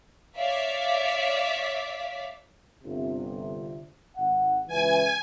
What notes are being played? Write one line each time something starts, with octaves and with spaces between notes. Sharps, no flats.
C#5 D5 E5 F5 D6 B6
G1 C3
G#1 F#5
C#2 E3 G#5